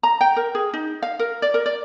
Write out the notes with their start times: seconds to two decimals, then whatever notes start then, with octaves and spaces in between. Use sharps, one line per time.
0.03 A#5
0.21 G5
0.36 A#4
0.55 G#4
0.73 D#4
1.02 F5
1.19 A#4
1.42 D5
1.54 A#4
1.66 D5